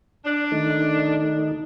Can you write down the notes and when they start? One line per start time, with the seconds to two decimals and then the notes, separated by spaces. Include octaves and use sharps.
0.25 D4
0.52 D#3 A3 D#4